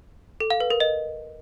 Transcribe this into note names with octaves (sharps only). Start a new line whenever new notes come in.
A4
F5
B4
A#4
D#5